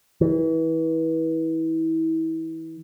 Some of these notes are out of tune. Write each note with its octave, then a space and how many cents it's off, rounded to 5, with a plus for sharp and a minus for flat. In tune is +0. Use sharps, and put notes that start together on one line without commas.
E3 -30